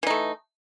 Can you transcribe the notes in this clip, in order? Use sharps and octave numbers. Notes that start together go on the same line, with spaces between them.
E3 A3 D#4